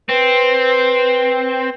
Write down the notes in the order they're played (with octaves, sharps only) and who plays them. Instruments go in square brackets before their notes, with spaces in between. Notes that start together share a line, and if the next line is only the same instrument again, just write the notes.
[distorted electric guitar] C4 [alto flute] B4